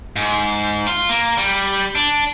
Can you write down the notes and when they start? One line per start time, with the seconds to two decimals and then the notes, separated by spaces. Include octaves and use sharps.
0.16 G#2
0.87 F4
1.09 A#3
1.37 G3
1.95 D4